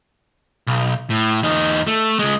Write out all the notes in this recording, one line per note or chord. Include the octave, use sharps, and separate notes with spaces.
B1
A2
E2 D#4
A3
C#2 G#3